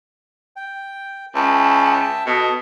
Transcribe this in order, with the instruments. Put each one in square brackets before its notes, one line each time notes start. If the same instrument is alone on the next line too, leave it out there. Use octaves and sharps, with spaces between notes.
[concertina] G5
[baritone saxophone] C#2 [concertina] E5 G5 A5
[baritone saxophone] B2 [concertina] A4 D#5